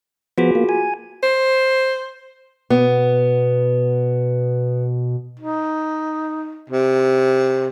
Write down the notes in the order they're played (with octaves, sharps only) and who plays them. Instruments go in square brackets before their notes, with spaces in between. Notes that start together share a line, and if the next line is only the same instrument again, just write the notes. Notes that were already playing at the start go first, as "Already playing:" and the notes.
[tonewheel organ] F3 B3 [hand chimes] F4 F#4 G#4
[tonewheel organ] A#3
G#5
[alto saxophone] C5
[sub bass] B2 [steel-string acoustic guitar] B3
[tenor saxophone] D#4
C3